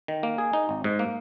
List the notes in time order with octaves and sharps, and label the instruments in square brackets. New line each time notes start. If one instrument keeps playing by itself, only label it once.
[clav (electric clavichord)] D#3
A#3
G#4
D#4
G#1
G#2
A#3